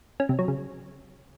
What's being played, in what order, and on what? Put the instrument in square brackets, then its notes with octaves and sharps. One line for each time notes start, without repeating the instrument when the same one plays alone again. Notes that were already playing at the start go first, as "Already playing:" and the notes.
[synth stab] C#4
C3
F#3
C#3